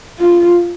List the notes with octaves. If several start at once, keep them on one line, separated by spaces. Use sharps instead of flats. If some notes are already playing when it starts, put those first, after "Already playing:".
F4